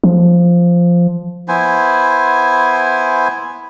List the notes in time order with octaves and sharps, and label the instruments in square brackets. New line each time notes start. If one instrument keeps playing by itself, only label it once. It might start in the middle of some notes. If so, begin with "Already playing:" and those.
[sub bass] F3
[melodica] B3 E4 C5 G#5